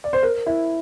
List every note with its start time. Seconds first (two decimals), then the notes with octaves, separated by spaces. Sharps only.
0.04 D5
0.13 C5
0.23 A#4
0.46 E4